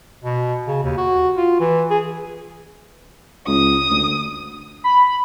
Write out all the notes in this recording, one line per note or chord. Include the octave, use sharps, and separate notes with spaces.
B2
C#3
D#2
F#4
F4
E3
G#4
C#2 D#6
D2
B5